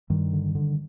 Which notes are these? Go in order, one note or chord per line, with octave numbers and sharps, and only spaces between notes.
G2 D#3 G3
D3
D3